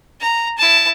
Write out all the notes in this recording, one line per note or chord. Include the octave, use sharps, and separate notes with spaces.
A#5
E4 A5